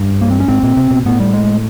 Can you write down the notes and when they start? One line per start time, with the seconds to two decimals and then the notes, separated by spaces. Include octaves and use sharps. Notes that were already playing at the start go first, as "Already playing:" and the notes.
Already playing: G2
0.21 A#3
0.31 C4
0.40 C#4
0.48 G#2 C4
0.63 A#2
0.77 C3
0.91 B2
1.06 A2 B3
1.20 G3
1.33 G#3